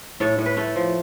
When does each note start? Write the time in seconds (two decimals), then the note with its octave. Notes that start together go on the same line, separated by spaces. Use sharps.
0.20 A2 A4 C#5
0.38 A2
0.46 B4
0.56 A3 A4 C#5
0.76 F3